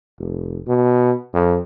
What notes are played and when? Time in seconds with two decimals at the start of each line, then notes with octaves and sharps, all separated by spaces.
0.19 F1
0.67 B2
1.33 F2